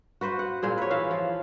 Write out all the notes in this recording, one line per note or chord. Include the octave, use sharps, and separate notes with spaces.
F#4 B4 C5 F#5
F#5
A#2 C4 G#4
B4 C#5
E3 E5 F5
F3